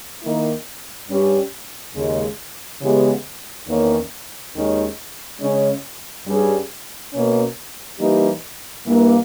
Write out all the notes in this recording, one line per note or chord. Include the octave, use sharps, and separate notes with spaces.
D#3 A#3 E4
G2 G3 C#4 G4
D#2 C#3 G#3
C#3 E3 G#3 B3 G4
E2 D#3 A#3 C#4
D#2 D#3 G#3 C#4
C#3 G#3 C#4
G2 G3 C#4 G#4
B2 A#3 C#4
E3 G3 A#3 D#4 G4
G2 E3 A#3